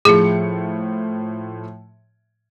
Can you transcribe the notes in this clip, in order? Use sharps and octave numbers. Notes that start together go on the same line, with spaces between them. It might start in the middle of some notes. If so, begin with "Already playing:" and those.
A2 F3 G#4 C#7